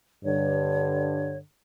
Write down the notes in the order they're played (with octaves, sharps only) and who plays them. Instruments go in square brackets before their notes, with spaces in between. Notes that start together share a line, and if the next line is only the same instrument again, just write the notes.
[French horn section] G2 D3 [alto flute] C#5